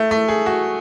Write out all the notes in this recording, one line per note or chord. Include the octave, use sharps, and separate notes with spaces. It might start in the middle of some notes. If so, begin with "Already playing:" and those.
Already playing: A3
A3
G#4
F#4